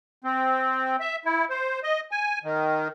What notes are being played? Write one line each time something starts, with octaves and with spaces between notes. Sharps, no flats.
C4
E5
E4
C5
D#5
G#5
D#3